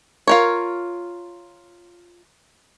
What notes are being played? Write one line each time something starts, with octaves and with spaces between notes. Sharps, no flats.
F4 A#4 C#5